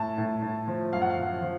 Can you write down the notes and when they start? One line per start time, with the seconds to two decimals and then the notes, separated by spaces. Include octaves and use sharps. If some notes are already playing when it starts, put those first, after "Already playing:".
Already playing: A2 A5
0.18 A2
0.43 A2
0.68 F3
0.92 F#2 F5
1.02 F#5
1.10 F5
1.17 F3
1.42 F3